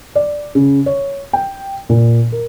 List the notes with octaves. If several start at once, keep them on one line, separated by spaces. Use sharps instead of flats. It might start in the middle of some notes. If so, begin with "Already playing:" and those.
D5
C#3
C#5
G5
A#2
A#4